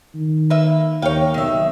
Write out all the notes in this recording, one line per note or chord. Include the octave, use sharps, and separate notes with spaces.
D#3
A#3 B4 E5
D#2 D#4 C#5 F5 G5
B1 D#3 E5